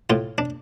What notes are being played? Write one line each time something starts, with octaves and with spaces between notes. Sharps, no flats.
A2 F4
D4